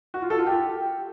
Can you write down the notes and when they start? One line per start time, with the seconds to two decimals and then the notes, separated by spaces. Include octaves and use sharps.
0.14 F#4
0.22 F4
0.30 A4
0.38 F4
0.47 G4